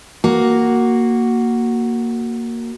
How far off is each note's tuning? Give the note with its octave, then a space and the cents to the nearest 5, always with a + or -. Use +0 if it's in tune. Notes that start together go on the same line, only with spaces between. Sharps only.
A#3 +0 F#4 +0